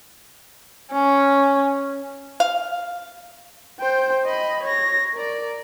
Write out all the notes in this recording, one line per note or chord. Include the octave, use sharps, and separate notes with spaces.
C#4
F5
C5 G5
D#5 B5
C#5 A#6
A#4 D5